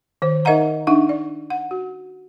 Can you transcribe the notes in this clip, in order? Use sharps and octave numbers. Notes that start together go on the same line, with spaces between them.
D#3 C5
D#4 A#4 D#5 E5 F#5 A#5
D4 D#4 E5 F#5
D5
F#5
F#4